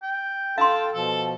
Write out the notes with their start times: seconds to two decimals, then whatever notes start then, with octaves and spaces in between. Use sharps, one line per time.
0.02 G5
0.58 F4 A4 F5 G5 A5 C6
0.94 B2 F3 A4